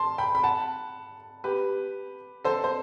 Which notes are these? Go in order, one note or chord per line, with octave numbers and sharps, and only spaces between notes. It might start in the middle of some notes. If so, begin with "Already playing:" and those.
Already playing: A5 C6
G5 B5
B5
F#5 A5
G4 B4
A4 C5
C5